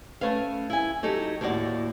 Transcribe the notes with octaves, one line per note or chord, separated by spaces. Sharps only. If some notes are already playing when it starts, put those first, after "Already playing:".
A3 C#4 B4 F5
E4 G#5
F#3 D#4 G4 A4
D#2 A2 A#3 F#4 D5